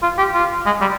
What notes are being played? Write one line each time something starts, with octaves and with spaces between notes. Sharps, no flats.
F4
G4
F4
G#3
G3